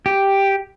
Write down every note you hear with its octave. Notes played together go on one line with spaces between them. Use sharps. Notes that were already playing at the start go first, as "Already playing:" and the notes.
G4